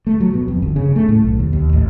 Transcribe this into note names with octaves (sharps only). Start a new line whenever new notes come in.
A3
F#3
B2
F2
G1
C#3
A3
A2
B1
D#2
D#2
A1